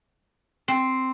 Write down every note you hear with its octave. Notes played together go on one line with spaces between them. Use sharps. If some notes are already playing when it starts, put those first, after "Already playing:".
C4